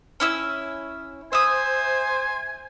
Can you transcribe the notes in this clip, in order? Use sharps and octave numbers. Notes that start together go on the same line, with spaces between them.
C#4 E4 E6
C5 E5 G#5 D#6